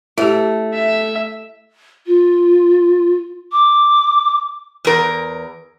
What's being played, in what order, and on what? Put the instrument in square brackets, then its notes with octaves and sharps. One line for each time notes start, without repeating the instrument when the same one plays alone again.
[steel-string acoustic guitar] A3 [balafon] E4 G4
[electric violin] E5
[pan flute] F4
D6
[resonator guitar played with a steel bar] E2 A#4